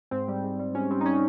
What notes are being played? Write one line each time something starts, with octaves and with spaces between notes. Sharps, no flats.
G#2 C4
G3
G#2
G3
G#2 C#4
G3 C4
D#4
C#4